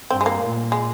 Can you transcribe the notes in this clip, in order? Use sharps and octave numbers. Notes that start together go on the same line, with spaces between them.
G2 C4
G#3
A#3
A#2
G#3